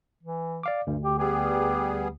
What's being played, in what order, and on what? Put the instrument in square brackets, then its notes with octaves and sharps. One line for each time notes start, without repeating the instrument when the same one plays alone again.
[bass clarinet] E3
[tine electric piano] D5 F5 D6
[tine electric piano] D2 [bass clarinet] G2
[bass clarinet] G4
[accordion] G3 B3 G#4 [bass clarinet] G4